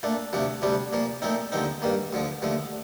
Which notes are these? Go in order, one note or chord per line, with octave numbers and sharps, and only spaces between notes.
A#2 A3 D4
D2 C3 F3 A3 D4
D2 C3 G3 D4
A#2 F3 A#3
A#2 F3 A3 C4 D#4
D#2 D3 F3 C4 D#4
G2 D#3 A#3
D2 D3 F3
D#2 D3 F3 A3